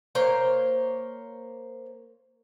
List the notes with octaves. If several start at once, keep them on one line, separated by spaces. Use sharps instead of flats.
A#3 C5 C#5